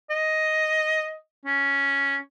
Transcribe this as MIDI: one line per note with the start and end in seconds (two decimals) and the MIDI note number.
0.10 1.16 75
1.46 2.18 61